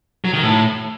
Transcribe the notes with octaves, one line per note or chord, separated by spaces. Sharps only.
F#3
D#3
A2